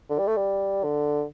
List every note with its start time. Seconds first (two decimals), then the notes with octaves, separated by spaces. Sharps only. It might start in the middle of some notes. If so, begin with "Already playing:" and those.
0.10 D3
0.19 G3
0.27 A3
0.37 G3
0.84 D3